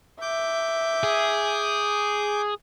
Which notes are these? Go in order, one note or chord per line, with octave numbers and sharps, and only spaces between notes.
E5 D6 G6
G#4